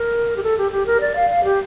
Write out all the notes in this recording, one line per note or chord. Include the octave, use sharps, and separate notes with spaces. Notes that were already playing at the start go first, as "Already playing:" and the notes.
Already playing: A#4
G4
A4
G4
G4
A#4
D5
F5
F5
G4